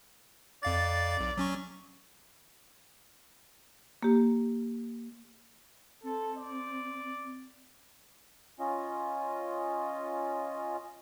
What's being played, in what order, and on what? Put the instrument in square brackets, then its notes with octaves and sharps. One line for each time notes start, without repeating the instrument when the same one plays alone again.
[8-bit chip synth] F2 F5 A6 [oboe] D5
[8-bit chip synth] B1
F#3 C#4 C#6
[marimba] A#3 G4
[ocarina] C4 [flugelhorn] A4
[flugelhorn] D5
[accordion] C#4 F4 D#5